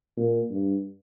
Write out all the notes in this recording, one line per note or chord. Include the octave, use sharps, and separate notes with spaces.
A#2
G2